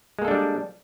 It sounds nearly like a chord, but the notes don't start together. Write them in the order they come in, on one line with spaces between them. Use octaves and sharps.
G#3 A#3 A4 D4 G3